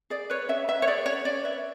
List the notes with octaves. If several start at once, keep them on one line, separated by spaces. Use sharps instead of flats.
G#4 D5
B4 C#5
C#4 E5
B4 E5
C#5
G#4 D5
C#4 C#5
C#4 D5
B4 E5